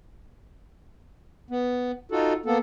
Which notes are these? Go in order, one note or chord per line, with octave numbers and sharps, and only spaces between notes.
B3
D#4 F4 F#4 A4
A#3 B3 A4